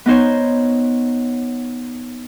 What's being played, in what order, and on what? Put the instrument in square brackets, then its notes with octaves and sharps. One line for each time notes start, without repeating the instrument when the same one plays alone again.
[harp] B3 D#4 C5 C#5